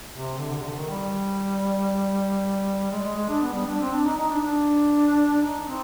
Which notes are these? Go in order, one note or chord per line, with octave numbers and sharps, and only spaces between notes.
C3
D3
D3
C3
D3
D#3
G3
G#3
G#3
G#3
D4
B3
G3
D4
C4
D4
D#4
D#4
D4
D4
D#4
C4